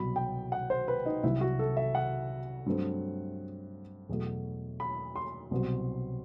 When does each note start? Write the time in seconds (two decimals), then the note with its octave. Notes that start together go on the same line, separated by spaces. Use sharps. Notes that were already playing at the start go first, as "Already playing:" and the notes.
Already playing: C2 B2 F#3 B5
0.16 G5
0.52 F#5
0.70 C5
0.88 B4
1.06 D#4
1.23 C2 C3 F#3 E4
1.41 F#4
1.59 A4
1.77 E5
1.95 F#5
2.66 G2 F#3 A3 C4
4.09 E2 B2 F#3 A3
4.80 B5
5.16 C6
5.51 C2 B2 F#3 C4